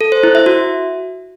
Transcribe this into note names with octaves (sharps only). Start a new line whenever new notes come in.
A4
C5
E4
E5
F#4